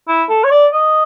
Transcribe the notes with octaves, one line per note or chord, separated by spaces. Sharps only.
E4
A4
C#5
D5
D#5